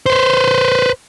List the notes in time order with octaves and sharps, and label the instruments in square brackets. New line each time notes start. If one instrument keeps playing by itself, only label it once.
[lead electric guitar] B4 C5